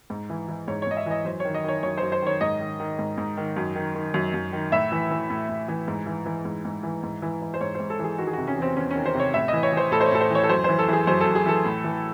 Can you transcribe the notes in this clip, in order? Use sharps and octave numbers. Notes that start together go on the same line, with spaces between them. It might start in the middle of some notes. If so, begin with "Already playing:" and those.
G#2
E3
E3
G#2 C#5
C#5
G#2 D#5
E5
E3 D#5
F#2 C5
D#3 C#5
D#5
D#3 C#5
F#2 C#5
C5
F#2
C5
D#3 C#5
G#2 D#5
D#3
D#3
G#2
G#2
D#3
F#2
D#3
D#3
F#2
F#2
D#3
A2 E5
E3
E3
A2
A2
E3
G#2
E3
E3
G#2
G#2
E3
G#2
E3
E3
C5
G#2 C#5
G#2 C5
A4
E3
G#4
D#3 F#4
G#4
C3 F#4
C#4
E2 C4
E2 C#4
D#3 C#4
C5
C3
C#5
A2 E5
E3 D#5
C#5
E3 C5
A2 A4
C5
C#5
A2 A4
C5
E3 C#5
A4
F#2 C5
E3 C5
A4
E3 G#4
F#2 C5
A4
F#2
G#4
E3 A4
A2
E3